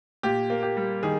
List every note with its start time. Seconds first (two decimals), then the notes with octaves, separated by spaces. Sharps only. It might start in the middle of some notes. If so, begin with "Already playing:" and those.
0.23 A#2 G4
0.50 A#3
0.63 G4
0.77 G3
1.03 D#3 G#4